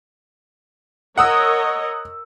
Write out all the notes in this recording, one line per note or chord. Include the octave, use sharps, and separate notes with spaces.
A#4 C#5 D#5 F#5 D#6 E6